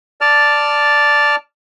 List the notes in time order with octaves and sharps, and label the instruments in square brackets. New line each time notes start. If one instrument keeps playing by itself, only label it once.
[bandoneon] D5 A5 F6